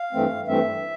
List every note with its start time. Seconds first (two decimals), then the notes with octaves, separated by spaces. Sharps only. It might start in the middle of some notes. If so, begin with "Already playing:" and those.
Already playing: F5
0.13 G2 E3 A3 C4
0.47 G2 E3 A3 C4 E5